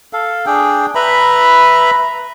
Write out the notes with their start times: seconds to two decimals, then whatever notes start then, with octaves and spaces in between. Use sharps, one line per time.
0.13 A4 F5
0.46 D4 G#4 G5
0.95 B4 E5 A#5 B5